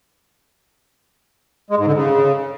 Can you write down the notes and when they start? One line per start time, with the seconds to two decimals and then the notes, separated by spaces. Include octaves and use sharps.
1.70 G#3
1.78 G#2
1.87 D3
1.95 C#3